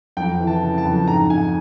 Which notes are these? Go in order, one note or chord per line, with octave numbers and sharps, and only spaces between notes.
F2 G5
E3
A5
C#3
A5
F2
G#2 A#5
G#2 G#5